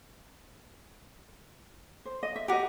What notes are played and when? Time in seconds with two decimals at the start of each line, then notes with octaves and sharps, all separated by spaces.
2.05 C5
2.23 D#5
2.36 E5
2.48 F#4 G4 A#4 D#5